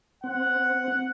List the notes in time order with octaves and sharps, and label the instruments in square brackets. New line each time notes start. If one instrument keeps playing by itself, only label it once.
[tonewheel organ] C4 [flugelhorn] F#5